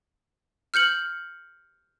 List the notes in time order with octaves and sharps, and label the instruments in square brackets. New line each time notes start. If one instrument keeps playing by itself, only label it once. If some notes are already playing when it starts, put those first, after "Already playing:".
[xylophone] F6 G6 C#7 F#7